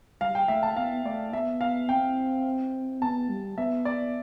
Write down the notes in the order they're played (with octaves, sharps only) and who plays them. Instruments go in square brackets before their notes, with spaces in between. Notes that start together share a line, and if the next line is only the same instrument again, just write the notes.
[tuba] G3 [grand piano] F5
[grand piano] G5
[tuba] A3 [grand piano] E5
[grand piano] A5
[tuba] B3 [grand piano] F5
[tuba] A3 [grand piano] D5
[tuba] B3 [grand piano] E5
[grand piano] F5
[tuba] C4 [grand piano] G5
[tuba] B3 [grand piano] A5
[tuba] G3
[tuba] B3 [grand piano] E5
[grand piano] D5